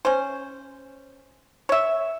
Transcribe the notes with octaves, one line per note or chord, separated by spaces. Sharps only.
C#4 C5
C#5 E5